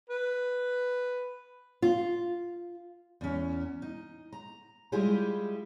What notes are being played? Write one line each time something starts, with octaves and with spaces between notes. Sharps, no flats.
B4
F4
E2 C#4
D#4
A#5
G3 G#3 E4 F4 G4 G#4